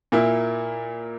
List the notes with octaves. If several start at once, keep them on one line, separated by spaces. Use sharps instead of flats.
A#2 A#3 E4